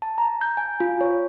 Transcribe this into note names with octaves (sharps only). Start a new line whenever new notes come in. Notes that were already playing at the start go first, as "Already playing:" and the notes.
A5
A#5
G6
G#5
F4
C#5